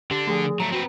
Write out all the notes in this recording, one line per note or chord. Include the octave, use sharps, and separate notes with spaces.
D3 D4 G4
F3 A3 G#4
F#3 A3 A#5
C4 F#4 B4